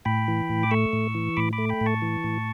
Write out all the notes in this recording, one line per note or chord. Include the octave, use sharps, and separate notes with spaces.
A2 G5 B5
E3
A2
D6
A3 C#6 E6
A2
E3
A2 B5 D6
B5 D6
A3
G5 B5
A2
A5 C#6
E3
A2